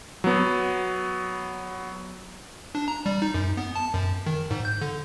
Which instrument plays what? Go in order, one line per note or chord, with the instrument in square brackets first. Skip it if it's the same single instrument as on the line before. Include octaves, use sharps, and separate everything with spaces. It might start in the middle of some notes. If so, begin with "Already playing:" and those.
[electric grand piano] F#3 B3
[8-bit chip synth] D4
A#5
G3
D#4
F#2
B3
A5
F#2
D#3
G#2
G6
D3